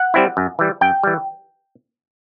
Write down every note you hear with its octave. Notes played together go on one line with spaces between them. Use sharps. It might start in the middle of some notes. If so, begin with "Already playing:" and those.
Already playing: F#5
G3 C4 E4
F#2
E3 G3
F#2 G5
E3 G3